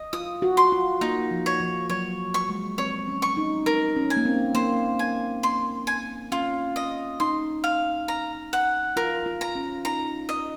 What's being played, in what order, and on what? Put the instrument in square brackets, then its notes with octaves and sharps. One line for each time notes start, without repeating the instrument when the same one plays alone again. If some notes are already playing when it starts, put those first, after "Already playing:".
Already playing: [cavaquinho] D#5
[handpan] F4 [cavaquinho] D#6
[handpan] F#4
[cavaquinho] C6
[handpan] F4
[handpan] A#3 [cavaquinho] D#4
[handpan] F3
[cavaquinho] C#5
[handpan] F3
[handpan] F#3 [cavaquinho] C#5
[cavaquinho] C#6
[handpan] G#3
[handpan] C4 [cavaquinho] C#5
[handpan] C#4
[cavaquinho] C#6
[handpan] D#4
[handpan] D#4 [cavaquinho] A#4
[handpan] C#4
[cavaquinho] G#5
[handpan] A#3
C4
[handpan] A#3 [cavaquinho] C5
[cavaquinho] G#5
[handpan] C4 [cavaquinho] C6
[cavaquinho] G#5
[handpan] C#4 [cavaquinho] F4
[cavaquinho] D#5
[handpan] D#4 [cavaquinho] C6
[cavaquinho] F5
A#5
F#5
[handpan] F4 [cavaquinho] A#4
[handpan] F4
[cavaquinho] A#5
[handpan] C#4
[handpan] D#4 [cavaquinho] A#5
[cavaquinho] D#5